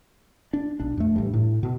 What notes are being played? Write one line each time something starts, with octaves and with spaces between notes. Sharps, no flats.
D4
B1 D4
F2 A3
A1 G2
A2
B2